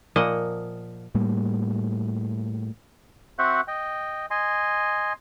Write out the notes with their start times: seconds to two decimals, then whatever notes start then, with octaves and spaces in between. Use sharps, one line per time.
0.16 A#2 F3 A#3 D#5 F#5
1.15 A2 G3 A#3
3.39 C4 F#4 C5 E5 F#5 F#6
3.68 D#5 G5
4.30 D#5 G#5 C6